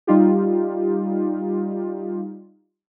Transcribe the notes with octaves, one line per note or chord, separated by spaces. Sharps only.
G3 D#4 F4 G4